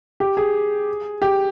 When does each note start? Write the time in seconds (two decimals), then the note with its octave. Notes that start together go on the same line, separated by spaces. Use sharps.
0.20 G4
0.37 G#4
1.22 G4